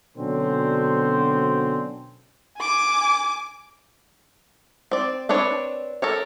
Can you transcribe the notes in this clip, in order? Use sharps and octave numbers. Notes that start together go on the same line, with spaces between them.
B2 D3 F#3 C4 C#4 C5
G#5 D6
C4 D5
C4 D4 B4 C#5
A4 A#4 C#5